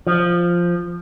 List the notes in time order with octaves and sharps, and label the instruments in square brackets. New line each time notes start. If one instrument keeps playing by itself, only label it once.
[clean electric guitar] F3